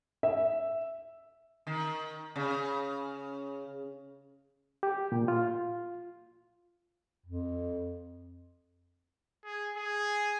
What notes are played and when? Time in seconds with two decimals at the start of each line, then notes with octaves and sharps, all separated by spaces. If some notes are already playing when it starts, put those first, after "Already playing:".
0.23 E5
1.67 D#3
2.36 C#3
4.83 G4
5.12 A#2
5.28 F4
7.26 F2
9.45 G#4
9.77 G#4